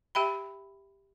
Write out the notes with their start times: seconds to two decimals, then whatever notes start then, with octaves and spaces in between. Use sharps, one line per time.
0.15 G4 E5 G5 B5